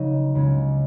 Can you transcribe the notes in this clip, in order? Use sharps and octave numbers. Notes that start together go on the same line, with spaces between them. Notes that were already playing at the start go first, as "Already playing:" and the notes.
Already playing: C#3 F#3 D#4
C#2 C#3 G#3 C#4